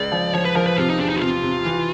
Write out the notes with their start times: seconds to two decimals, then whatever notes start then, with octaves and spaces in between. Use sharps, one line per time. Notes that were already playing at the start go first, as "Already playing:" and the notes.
Already playing: C#2 D5
0.12 F3
0.34 F3 C#5
0.45 B4
0.55 F3 A#4
0.67 B4
0.77 C3 F4
0.89 D#4
0.99 E2 D4
1.10 D#4
1.16 F#4
1.21 C3 F4
1.43 C3
1.65 E3